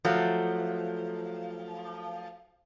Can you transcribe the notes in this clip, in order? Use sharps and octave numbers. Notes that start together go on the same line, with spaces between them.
F3 F#3 A3